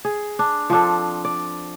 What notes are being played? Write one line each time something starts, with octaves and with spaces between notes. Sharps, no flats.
G#4
D4
F3 C4 D4 A4
D5